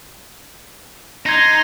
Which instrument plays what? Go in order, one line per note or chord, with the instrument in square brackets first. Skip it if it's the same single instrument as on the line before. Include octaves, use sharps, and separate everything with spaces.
[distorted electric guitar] D#4 [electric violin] A#5 C6 [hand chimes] G#6 A#6